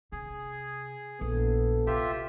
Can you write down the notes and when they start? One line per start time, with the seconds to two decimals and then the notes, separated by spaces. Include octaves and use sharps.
0.12 C3 G#4
1.21 A#1 B3 E4 A4
1.87 C3 F4 G4 E5